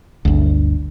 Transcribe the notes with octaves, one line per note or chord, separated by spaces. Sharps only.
G1 D2